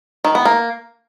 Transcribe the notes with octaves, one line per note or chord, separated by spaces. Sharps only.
D#3
B3
A#3